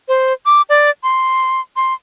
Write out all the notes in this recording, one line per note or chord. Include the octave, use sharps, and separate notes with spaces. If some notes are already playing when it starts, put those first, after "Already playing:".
C5
D6
D5
C6
C6